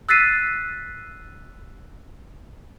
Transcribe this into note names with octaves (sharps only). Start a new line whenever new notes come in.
E6 F#6 A6 B6 C7 D#7